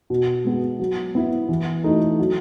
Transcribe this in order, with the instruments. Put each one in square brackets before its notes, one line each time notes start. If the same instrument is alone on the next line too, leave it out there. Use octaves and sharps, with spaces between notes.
[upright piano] B2
G#3 B3 F#4
F#3
B3 E4
E3
A3 D#4 F#4
F#3